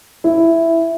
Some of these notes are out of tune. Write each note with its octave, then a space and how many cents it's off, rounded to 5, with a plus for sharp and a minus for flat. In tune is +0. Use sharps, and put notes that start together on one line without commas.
E4 +5